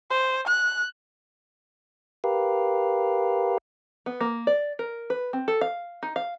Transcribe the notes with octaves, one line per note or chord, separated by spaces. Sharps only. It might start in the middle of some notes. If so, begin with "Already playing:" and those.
C5
F#6
G4 A#4 B4 F5
B3
A#3
D5
A#4
B4
C4
A4
F5
D#4
F5